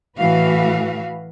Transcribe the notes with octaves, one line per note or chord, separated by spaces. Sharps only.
A2 E3 F#4 B4 F5